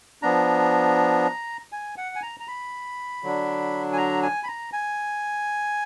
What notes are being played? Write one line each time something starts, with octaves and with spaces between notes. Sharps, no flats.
F3 B3 D4 A#5
G#5
F#5
G#5
A#5
A#5
B5
D3 F#3 D4
G#5
A#5
G#5
B5
A#5
G#5